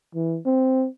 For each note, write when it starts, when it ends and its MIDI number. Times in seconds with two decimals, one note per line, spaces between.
0.15 0.38 52
0.46 0.86 60